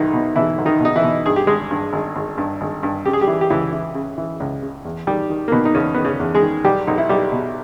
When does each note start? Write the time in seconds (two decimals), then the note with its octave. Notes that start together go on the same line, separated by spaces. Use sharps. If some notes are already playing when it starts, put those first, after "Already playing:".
Already playing: B1 D#3 D#4 E4
0.13 B2
0.36 B2 E3 E4
0.58 B1
0.66 D#3 D#4
0.81 B2 D#4
0.96 E3 E4
1.03 B2
1.26 G2 G#4
1.36 G4
1.47 G#1 G#3 G#4
1.71 G2
1.93 G#1
2.16 G#1
2.38 G2
2.61 G#1
2.83 G2
3.05 C#3 G4
3.13 G#4
3.21 G3 G4
3.27 E3
3.41 G4
3.50 C#2 E3 E4
3.72 E3
3.95 C#3
4.18 E3
4.40 C#2
4.62 C#3
4.85 E2
5.07 D#3 G3 G4
5.30 D#3
5.48 A#3
5.52 B2 D#3 B3
5.65 D#4
5.75 E2 C#3 C#4
5.94 D#3 B3
6.05 C#3 C#4
6.20 E2
6.34 G#3 G#4
6.42 D#3
6.64 B1 G3 G4
6.87 B1 D#4
6.98 E4
7.09 B1 G3 G4
7.32 B2